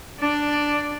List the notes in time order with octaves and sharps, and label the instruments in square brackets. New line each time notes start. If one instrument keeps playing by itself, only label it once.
[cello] D4 D5